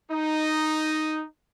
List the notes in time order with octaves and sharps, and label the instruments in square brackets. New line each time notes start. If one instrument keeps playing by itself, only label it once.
[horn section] D#4